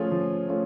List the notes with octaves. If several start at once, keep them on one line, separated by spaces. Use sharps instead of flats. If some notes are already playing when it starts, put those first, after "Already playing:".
Already playing: F3 A3 C#4 F4 G#4
F3
A3 C#4 F4